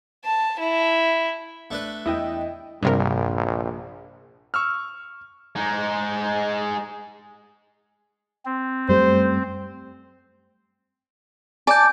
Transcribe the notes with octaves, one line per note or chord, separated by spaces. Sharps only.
A5
E4
A3 D4 B4
E2 E4 D#5 G5
A#1 G2 C3 A#4
C#6 E6 F6
G#3 D#4
C4
F#2 G3 A3 C5
D5 G#5 A5 G6